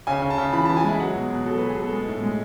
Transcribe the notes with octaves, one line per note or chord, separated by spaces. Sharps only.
C#3 G#5
C#3
A5
C#3
E3 B5
A5
E3
G#5
G#3 E5
F#3 F#5
B2
B2
F#3 A4
B4
B2
G#4
B2 A4
G#3
A2
G#3